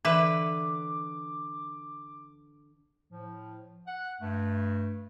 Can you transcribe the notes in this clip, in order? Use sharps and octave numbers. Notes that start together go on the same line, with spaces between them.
D3 E3 B4 E5 D6
A2 F3
F#5
G2 A3